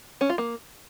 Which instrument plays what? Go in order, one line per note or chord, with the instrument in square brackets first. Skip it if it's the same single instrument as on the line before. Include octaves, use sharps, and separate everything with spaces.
[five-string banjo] C#4
F4
A#3